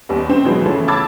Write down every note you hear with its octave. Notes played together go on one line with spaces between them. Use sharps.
D#2 G3 B3
C4
B2 E3 F#3 G#3 B3
C#3 E3 F3 A3
A5 B5 D6 E6 G#6 A6